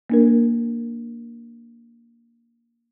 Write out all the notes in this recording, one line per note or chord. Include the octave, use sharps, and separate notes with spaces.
A#3 D4 A#4